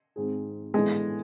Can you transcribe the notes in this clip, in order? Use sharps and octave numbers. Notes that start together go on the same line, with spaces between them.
G#1 G#2 G#3 C4 G#4
A2 E3 G#3 B3 D4